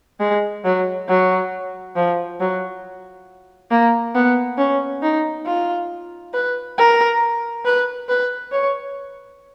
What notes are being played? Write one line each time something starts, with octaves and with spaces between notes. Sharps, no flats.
G#3
F#3
F#3
F3
F#3
A#3
B3
C#4
D#4
F4
B4
A#4
B4
B4
C#5